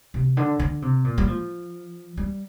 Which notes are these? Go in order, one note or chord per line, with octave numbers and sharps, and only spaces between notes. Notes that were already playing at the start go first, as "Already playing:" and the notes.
C3
D3
D3
C3
A#2
G3
F3
G3